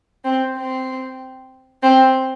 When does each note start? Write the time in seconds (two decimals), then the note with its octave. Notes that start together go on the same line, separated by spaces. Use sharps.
0.24 C4
0.57 C4
1.83 C4